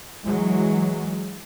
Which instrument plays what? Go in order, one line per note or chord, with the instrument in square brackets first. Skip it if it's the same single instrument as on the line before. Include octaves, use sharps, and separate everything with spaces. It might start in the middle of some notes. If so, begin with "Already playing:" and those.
[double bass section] E3 F#3 G#3